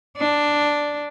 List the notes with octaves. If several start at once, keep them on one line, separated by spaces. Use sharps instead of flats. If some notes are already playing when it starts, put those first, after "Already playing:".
D4